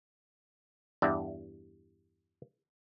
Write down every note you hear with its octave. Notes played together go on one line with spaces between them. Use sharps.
E2 G2 D5 E5